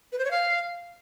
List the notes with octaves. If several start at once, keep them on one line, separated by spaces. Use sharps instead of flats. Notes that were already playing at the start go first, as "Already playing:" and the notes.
B4
C5
C#5
F5